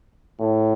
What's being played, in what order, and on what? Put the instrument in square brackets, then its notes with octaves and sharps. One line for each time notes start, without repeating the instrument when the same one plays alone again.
[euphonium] A2